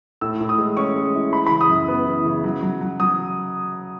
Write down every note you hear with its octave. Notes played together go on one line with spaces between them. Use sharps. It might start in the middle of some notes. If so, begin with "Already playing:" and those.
A2 E6
A2
D#6
G#3
C#4 C#6
G#3
E4
E3 B5
C#3 B5
D#6
F#2
B3
E3
C#3
F#3
F#3
F#3
F#3 D#6